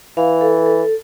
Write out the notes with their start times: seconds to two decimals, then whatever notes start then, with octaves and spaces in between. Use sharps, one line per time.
0.17 E3 F5
0.41 A4
0.66 A4